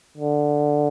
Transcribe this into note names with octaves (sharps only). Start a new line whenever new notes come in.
D3